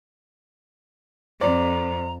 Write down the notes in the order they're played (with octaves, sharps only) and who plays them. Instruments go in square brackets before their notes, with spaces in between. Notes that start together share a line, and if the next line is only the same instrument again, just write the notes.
[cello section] F2 [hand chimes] C5 [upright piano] D5 [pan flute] A#5